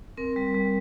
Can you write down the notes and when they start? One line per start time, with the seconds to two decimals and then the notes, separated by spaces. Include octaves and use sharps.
0.17 C4 A#4
0.36 G3
0.54 G3